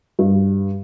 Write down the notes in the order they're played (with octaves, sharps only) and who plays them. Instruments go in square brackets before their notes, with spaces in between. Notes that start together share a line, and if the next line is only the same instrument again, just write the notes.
[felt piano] G2